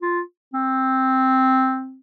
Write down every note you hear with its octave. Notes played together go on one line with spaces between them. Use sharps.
F4
C4